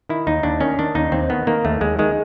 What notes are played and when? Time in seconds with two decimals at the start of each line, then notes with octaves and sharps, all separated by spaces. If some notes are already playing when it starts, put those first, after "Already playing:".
0.09 D#3 E4
0.27 D#2 D#4
0.43 D#2 D4
0.61 D#3 C#4
0.79 D#3 D4
0.95 D#2 D#4
1.12 D#2 C4
1.30 D#3 B3
1.47 D#3 A#3
1.65 D#2 A3
1.81 D#2 G#3
1.99 D#3 G#3